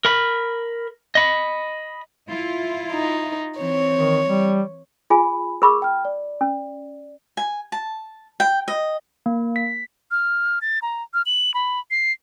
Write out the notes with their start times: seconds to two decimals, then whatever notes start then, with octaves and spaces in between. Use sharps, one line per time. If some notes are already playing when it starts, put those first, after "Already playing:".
0.05 A#4 B5
1.15 D#5 B5
2.29 E4 F4
2.92 D#4
3.58 E3 C4 C#5
3.95 D#3
4.28 G3
5.10 F4 G#4 G#5 B5
5.62 G#4 A#4 B5 C#6 D6 E6
5.82 G5 F6
6.05 D5
6.41 C#4
7.37 G#5
7.72 A5
8.40 G5
8.68 D#5
9.26 A#3
9.56 B6
10.11 F6
10.61 A6
10.82 A#5
11.14 F6
11.26 F#7
11.54 B5
11.91 C7